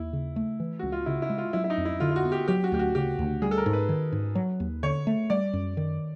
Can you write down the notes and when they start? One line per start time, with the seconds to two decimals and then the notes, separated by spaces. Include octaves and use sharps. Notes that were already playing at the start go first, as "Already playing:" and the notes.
Already playing: D#2 E4
0.13 C#3
0.36 A3
0.60 E3
0.79 C#2 F#4
0.92 F4
1.06 C#3 E4
1.22 E4
1.30 G#3
1.38 F4
1.53 F#3 E4
1.64 E4
1.70 D#4
1.78 F2
1.85 E4
2.00 D3 F4
2.11 F4
2.16 F#4
2.25 B3
2.32 G4
2.48 F#3 G4
2.64 F#4
2.72 D2 G4
2.79 F#4
2.95 C#3 G4
3.19 D2
3.42 G3 G#4
3.51 A4
3.58 A#4
3.66 G#2
3.73 B4
3.89 D#3
4.12 G#2
4.35 F#3
4.60 D#2
4.83 D3 C#5
5.07 A3
5.30 G3 D5
5.53 F#2
5.77 D#3